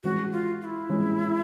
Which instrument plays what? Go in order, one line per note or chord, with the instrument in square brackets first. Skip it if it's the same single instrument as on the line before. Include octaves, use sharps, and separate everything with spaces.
[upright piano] E3 G#3 C#4 [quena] F#4
[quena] F4
F4
E4
[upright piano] E3 G#3 C#4